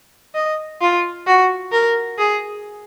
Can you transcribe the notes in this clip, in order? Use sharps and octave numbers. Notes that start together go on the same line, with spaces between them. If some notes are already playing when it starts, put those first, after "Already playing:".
D#5
F4
F#4
A#4
G#4